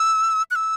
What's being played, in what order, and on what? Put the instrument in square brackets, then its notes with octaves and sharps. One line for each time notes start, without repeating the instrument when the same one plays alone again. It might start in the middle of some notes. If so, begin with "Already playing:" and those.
Already playing: [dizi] E6
F#6
E6